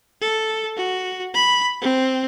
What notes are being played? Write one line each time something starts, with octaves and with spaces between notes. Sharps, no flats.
A4
F#4
B5
C4